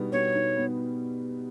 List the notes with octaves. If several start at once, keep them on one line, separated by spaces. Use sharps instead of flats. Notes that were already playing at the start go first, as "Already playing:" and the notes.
Already playing: B2 G3 B3 D#4
B2 C#5
D#4
B3